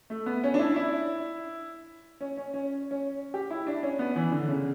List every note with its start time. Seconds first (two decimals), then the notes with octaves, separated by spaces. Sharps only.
0.10 A3
0.26 B3
0.44 C#4
0.54 D4
0.59 E4
0.70 D4
0.76 E4
2.21 C#4
2.37 C#4
2.54 C#4
2.91 C#4
3.34 G4
3.51 E4
3.67 D4
3.83 C#4
3.99 B3
4.16 E3
4.32 D3
4.48 C#3